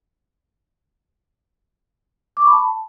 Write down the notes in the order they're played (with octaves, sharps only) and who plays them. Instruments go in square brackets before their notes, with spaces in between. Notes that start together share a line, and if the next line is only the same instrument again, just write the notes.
[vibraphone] D6
C#6
B5
A5